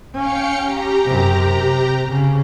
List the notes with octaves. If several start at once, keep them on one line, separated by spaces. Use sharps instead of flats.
C#4 F5 G5 C#7
G4 A#5
F#2 C3
C3
C#3